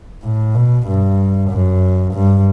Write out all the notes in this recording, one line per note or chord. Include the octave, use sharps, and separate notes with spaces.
A2
B2
G2
F#2
G2